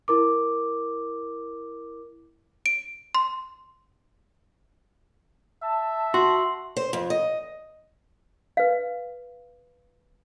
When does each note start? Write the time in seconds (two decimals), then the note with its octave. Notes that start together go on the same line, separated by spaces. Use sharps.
0.08 E4 A#4 D6
2.66 D7
3.15 C6
5.63 E5 A5
6.14 F#4 C6
6.77 C5
6.93 F2
7.10 D#5
8.57 B4 F5